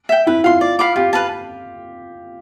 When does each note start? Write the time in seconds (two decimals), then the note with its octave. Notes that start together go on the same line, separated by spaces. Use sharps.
0.09 E5 G5
0.27 E4 B4
0.44 F4 F5 C6
0.61 D5
0.79 F5 B5 D6
0.96 F4 G4
1.13 B4 F5 A5